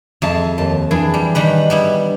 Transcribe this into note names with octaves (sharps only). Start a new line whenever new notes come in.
F2 G#4 E5 A5
D#2 A5
E3 D4 G#4
G3
D#3 G3 B4
G3 B3 E4